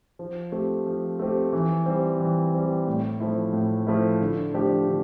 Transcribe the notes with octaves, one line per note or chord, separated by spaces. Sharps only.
F3
A3 C4 G4
F3
A3 C4 G4
E3
G3 C4
E3
G3 C4
A2
F3 A3 E4
A2
F3 A3 E4
D3
F3 A3 D4 G4
D3